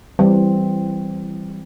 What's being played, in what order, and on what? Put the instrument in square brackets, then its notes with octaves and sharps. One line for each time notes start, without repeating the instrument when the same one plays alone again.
[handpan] E3 C4 [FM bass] G3